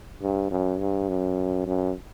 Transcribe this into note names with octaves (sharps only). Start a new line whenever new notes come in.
G2
F#2
G2
F#2
F#2